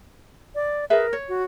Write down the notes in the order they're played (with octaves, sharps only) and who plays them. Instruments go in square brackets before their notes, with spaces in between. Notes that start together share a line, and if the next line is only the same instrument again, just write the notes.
[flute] D5
[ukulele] G#4 B4 E5 [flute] A#4
[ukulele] C#5
[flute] F#4